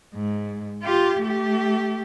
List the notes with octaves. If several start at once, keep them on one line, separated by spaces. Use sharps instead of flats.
G#2
F4 G4
A3 G4